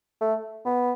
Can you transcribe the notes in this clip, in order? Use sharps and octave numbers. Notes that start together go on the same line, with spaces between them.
A3
B3